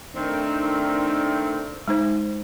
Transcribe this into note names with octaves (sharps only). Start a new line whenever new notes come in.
D#3 A3 C4 D4
G#3 D#4 C5